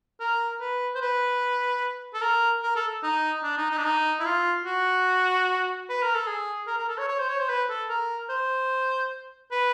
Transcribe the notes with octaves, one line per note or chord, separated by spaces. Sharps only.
A#4
B4
C5
B4
A4
A#4
A#4
A4
D#4
D4
D#4
D#4
D4
D#4
E4
F4
F#4
B4
A#4
A4
G#4
A#4
A#4
A4
C#5
C#5
C5
C#5
C5
B4
A4
A#4
C5
B4